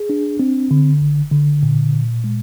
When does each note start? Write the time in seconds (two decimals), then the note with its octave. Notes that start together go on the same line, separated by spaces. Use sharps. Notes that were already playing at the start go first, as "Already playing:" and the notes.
Already playing: G#4
0.10 D4
0.39 C4
0.71 D3
1.01 G1
1.32 D3
1.63 A#2
1.93 A#2
2.24 G#3